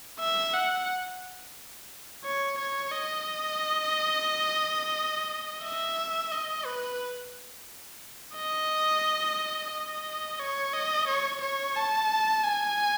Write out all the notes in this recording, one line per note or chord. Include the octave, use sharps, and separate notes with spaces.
E5
F#5
C#5
C#5
D#5
E5
D#5
B4
D#5
D#5
C#5
D#5
C#5
C#5
A5
G#5